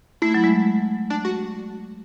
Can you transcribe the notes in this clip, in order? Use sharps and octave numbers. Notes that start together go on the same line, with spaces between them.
A3 E4
F#3
G#3
D4
F#4